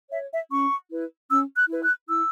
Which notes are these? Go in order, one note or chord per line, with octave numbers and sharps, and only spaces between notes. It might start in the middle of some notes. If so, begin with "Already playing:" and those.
C#5 E5
E5
C#4 C#6
E4 B4
C#4 E6
F#6
E4 B4
F#6
E4 E6